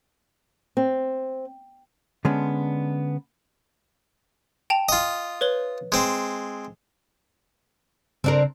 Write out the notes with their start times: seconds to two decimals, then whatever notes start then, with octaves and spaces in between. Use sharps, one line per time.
0.77 C4
2.25 D3 G#3 B3 C#4 D4
4.70 G5 A5 F7
4.89 F4 D#5
5.41 B4 C#5 G7
5.92 G#3 C4
8.24 C#3 C4 D4 A#4